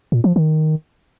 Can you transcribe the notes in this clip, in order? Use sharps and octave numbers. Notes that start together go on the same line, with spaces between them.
A#2
F3
D#3